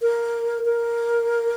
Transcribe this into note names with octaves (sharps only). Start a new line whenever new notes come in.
A#4
A#4